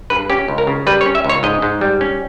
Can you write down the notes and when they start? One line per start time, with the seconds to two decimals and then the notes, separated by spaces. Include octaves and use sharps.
0.10 G2 B4
0.30 C#4 G4
0.48 C#2
0.58 A#4
0.67 C#3
0.87 G3 B4
1.01 C#5
1.06 C#4
1.15 E5
1.25 C#2 C#5
1.43 G#2 D#5
1.62 G#2
1.81 G3
2.01 C#4